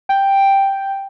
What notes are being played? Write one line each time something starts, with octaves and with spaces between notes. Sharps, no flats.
G5